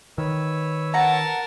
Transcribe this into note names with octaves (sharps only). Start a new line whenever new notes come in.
D#3 B4 C#5 E6
A#4 F#5 A5 A#5